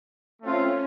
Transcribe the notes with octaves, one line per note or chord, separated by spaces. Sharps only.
A3 C4 C#4 F4